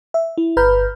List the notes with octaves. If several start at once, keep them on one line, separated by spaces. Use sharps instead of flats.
E5
E4
G1 B4 A#5 B5 F6 G6